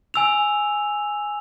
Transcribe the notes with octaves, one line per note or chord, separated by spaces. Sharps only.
G#5 E6 F7